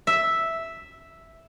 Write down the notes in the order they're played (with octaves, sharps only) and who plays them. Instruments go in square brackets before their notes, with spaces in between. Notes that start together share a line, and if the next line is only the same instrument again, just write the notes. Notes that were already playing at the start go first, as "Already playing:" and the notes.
[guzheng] E5